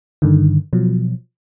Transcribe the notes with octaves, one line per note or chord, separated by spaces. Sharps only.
G2 D3 D#3
B2 F3 F#3